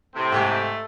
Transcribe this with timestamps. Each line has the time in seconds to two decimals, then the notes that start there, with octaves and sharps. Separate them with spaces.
0.15 A2 C3 C4
0.32 G#2 A3 G4